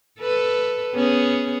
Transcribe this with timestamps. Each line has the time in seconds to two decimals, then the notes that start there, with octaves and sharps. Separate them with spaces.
0.21 A4 B4
0.95 B3 C#4 G#4